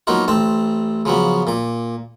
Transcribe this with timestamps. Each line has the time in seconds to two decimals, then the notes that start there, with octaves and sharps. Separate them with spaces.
0.07 F#3 A#3 B3 D#4 F4
0.28 A1 C4 A5
1.05 C#3 F3 F#3 B3
1.47 A#2 D6